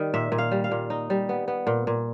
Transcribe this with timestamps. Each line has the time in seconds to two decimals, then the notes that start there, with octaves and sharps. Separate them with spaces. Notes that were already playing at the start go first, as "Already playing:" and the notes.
Already playing: D#3 G3
0.14 A#2 E5
0.32 A#2
0.38 F5
0.51 G3
0.64 F5
0.71 A#2
0.90 D#4
1.10 G3
1.29 B3
1.48 B3
1.67 A#2
1.87 A#2